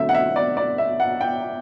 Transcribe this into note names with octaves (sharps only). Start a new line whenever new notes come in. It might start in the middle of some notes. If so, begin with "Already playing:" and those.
Already playing: D3 F#3 A3 C4 E5
F#5
E5
D5
D5
E5
F#5
G5